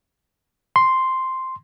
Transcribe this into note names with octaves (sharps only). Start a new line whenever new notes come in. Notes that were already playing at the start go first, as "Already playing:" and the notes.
C6